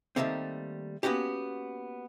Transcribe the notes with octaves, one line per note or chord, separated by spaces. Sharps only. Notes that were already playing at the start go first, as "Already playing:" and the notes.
D#3 F3 G3 A3 A#3 C4
A#3 B3 C#4 F#4 G4